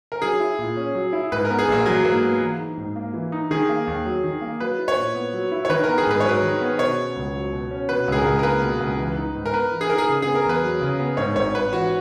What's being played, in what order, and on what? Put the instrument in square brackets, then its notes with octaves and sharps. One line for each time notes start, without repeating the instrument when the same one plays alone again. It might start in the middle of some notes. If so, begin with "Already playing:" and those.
[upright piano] A#4
[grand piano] F#3 [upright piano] G#4
[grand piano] E4
A#2
C#4
F#3
E4
[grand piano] G#2 [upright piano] B4
[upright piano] A#4
[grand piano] B3
[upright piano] G#4
[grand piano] A#1 [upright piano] A#3
[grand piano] E3 [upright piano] F#3
[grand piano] G#2 [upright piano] A#3
[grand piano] B3
E3
D#4
G#2
A#3
E3
D#4
[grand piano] D#3 [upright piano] G#4
[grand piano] A#3
D#2
F#3
D#3
A#3
[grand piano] F#3 [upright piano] B4
[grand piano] E4
[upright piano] C#5
[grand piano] A#2
B3
F#3
E4
[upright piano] C#5
[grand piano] D#3 [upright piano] B4
[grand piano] B3 [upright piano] A#4
[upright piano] G#4
[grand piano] G#2 [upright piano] B4
[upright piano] C#5
[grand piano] F#3 [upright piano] B4
[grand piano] D#3
B3
[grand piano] B2 [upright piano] C#5
[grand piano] C#4
C#2
F#3
B2
C#4
[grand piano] B2 [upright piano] B4
[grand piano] C#2 [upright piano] G#4
[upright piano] A#4
[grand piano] C#2
[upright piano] A#4
[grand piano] A#3 [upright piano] B4
[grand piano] B2
C#2
E3
D#4
G#2
[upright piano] A#4
[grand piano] B3 [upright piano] B4
[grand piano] E3
[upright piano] G#4
[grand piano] D#4 [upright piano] A#4
[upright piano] G#4
[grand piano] C#3
[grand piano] B3 [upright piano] G#4
[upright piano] A#4
[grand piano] E2 [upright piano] B4
[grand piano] F#3
C#3
B3
[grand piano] G#2 [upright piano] C#5
[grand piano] G#1 [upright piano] C#5
[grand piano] G#1 [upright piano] B4
[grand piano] E3 [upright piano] F#4